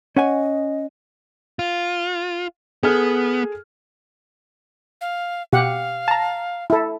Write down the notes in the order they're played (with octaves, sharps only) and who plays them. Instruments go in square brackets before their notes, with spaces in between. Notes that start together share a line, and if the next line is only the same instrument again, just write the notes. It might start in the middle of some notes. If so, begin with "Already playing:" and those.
[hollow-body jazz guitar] C#4 F#5 G#5 [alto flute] D#5
[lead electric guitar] F4
[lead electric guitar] B3 [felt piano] G#4 A4 F6
[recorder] F5
[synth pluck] B2 [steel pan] G4 F#5 [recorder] F5
[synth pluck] A5 A#5
[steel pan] E4 A4